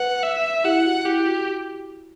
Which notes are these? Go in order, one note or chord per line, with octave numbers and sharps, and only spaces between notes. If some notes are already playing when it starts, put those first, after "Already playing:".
Already playing: B4 F#5
E5
E4 G4 F#5
F#4
E4 G4
F#4